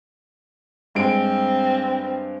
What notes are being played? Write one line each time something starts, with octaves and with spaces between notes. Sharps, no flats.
G2 G#3 C4 D7